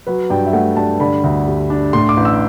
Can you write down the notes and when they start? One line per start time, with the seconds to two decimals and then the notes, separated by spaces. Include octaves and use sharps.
0.07 F#3 B4
0.30 G2 G5
0.46 E5
0.53 A3 F#5
0.77 G2 A5
1.00 D3 B5
1.24 D2
1.47 G3
1.70 D4
1.93 A2 C6
2.09 D6
2.17 A1
2.25 E6